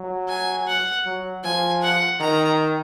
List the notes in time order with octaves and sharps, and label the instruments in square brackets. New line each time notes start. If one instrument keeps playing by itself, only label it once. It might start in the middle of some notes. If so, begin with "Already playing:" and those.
Already playing: [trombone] F#3
[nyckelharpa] G#5
F#5
[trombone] F#3
[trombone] F3 [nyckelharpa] G#5
[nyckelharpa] F#5
[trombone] D#3 [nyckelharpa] A#5